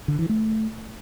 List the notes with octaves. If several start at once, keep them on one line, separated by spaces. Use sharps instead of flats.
D3
E3
A3